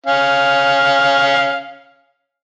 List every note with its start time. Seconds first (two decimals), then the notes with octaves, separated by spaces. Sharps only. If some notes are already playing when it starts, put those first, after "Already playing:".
0.06 C#4 F5